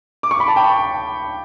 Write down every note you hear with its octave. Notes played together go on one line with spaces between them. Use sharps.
D6
C#6
B5
A5
G5